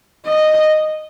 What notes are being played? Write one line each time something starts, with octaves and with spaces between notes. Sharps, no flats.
D#5